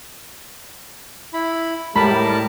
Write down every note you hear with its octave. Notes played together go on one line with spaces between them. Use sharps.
E4 B5
A2 G3 G#3 A#4 A5 B5